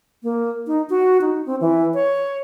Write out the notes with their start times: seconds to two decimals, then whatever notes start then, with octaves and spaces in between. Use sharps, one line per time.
0.23 A#3
0.67 D#4
0.90 F#4
1.21 D#4
1.46 C4
1.61 E3
1.94 C#5